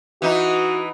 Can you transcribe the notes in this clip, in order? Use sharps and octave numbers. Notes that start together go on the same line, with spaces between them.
E3 D#4 F#4